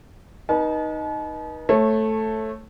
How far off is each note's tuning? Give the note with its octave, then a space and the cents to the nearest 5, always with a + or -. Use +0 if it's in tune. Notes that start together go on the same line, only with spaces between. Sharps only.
D#4 +0 B4 -40 A5 -40
A3 +0 C#5 -25